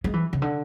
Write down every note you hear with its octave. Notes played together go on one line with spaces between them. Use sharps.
G#3
E3
C#3
D3